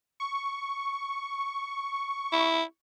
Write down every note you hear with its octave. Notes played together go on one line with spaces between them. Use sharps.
C#6
E4